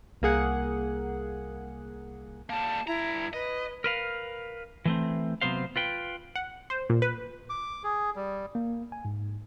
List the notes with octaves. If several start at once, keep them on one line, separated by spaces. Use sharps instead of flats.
C2 A#3 G#4 F#5
G3 A#3 A5
G2 E4 A#5
B4 D#5
A#4 B4 F5
E3 A3 C4
C3 D#3 F#3 B3 C5 F5
F4 B4 G5
F#5
C5
A#2
B4
D6
G#4
G3
A#3
G#5
G#2